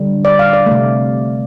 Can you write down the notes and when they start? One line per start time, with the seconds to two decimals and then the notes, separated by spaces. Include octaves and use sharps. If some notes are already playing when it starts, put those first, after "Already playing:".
Already playing: D3 G3
0.25 D5
0.39 F5
0.53 D5
0.66 A3
0.71 C3